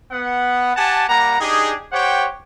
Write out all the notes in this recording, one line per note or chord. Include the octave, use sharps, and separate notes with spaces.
B3 F#5
G4 F#5 G#5 A5
G3 A#3 F#5 A#5
D4 D#4 G4 G#4
G4 C5 C#5 F#5 G5